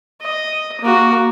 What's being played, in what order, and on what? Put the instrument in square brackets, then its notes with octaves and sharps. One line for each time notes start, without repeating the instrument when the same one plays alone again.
[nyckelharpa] D#5
A#3 F#4